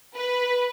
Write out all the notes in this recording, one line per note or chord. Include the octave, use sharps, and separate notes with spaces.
B4